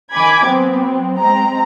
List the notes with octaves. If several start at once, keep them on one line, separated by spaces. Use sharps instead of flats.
D#3 G#5 B5 D6 G#6
F#3 B3 C4
G#3 C4 A#5